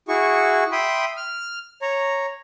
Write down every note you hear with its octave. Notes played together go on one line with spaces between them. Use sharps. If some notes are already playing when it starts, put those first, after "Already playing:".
E4 F#4 G#4 C#6
E5 G5 B5 C6 D#6
F6
C#5 A#5